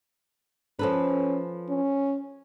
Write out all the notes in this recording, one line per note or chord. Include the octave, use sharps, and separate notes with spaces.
F3 C#4 A4 B4
C#4